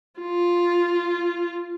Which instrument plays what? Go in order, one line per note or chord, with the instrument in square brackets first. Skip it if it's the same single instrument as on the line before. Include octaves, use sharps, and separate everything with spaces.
[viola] F4